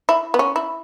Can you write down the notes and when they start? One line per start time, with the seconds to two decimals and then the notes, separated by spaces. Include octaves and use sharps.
0.09 E4
0.34 B3
0.39 C#4
0.56 E4